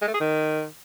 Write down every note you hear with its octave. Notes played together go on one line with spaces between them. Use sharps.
G#3
A3
G#4
D#3